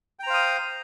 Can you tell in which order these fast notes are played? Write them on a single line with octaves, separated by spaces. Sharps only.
G5 A#5 C5 F5 D#6